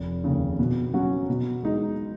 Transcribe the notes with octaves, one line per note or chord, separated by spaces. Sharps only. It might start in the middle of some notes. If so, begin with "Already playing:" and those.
Already playing: F1
D#2 C#3
B2
F#3 C#4 F#4
B2
G#3 D#4